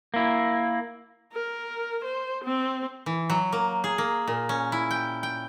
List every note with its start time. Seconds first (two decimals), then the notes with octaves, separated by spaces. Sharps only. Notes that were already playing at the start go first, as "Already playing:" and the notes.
0.14 A#3 E4
1.33 A#4
2.05 C5
2.45 C4
3.06 E3
3.30 F#3
3.53 A#3
3.84 G#4
3.98 A#3
4.27 A#2
4.49 C#4
4.72 E4
4.91 G5
5.23 G5